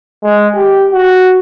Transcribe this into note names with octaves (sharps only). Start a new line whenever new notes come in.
G#3
G4
F#4